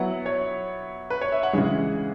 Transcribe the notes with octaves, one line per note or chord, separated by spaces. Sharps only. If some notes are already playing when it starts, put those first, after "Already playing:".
Already playing: F#3 B3 E4 F#5
C#5
B4
C#5
E5
F#5
C#3 E3 G#3